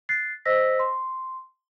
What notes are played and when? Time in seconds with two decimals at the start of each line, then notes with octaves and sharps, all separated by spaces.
0.09 F#6 A6 C7
0.45 C5 D#5 E6 A#6 B6
0.79 C6